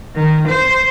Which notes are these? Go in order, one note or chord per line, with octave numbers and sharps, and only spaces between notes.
D#3
C5